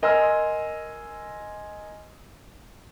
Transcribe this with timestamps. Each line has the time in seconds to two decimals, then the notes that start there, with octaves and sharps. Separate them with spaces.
0.02 A#4 D#5 G#5 C6 E6 F6